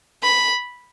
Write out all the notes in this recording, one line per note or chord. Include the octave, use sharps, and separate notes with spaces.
B5